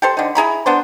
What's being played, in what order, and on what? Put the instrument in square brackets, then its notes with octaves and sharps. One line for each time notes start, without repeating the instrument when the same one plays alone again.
[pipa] G4 A4 C5
D3 D#4
E4 G#4 A#5 B5
B3 D4 C5